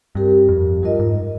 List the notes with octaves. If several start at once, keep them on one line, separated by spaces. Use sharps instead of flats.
G2 C4 G4 A#4
F2
G2 F4 A#4 D#5
G#2